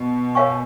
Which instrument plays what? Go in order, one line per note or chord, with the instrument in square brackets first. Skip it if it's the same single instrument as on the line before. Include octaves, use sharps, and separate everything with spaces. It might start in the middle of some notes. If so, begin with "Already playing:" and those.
Already playing: [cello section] B2
[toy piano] A#4 C#5 F5 G#5 C#6